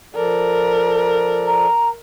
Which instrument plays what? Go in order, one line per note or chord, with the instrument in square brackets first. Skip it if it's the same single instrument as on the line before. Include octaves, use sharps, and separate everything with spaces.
[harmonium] F3 A4 D5 [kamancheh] A#4
[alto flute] A#5